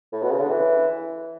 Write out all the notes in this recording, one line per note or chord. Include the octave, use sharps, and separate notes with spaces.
A2
B2
C#3
D3
E3